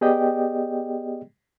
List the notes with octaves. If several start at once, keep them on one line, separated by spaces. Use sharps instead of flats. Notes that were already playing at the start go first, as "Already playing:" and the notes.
B3 G4 G#4 D5 D#5 G5